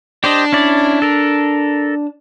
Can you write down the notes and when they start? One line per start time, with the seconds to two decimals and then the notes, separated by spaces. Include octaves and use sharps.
0.24 D4 G4 C5 D#5
0.53 C#4 E4 D5
1.02 A4 A#4